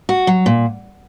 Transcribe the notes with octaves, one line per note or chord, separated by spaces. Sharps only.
F#4
F#3
A#2